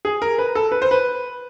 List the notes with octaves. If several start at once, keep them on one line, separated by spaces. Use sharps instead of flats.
G#4
A#4
B4
A4
B4
C5
B4